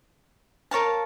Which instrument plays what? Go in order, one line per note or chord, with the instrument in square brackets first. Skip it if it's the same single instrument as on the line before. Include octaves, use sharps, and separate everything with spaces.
[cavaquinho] A#4 C#5 F5 A5